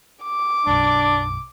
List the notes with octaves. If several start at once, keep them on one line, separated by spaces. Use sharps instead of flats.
D6
B1 F#2 D4